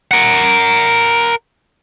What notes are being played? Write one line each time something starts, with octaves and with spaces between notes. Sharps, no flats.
A#4 F#5